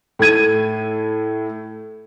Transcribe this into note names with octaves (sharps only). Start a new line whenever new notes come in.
A2 A3 G#6 D#7